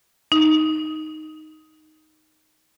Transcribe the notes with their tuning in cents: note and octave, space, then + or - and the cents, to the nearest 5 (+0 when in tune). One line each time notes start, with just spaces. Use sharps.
D#4 +0